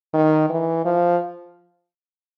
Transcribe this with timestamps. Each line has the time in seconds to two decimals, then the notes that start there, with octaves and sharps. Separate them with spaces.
0.14 D#3
0.49 E3
0.85 F3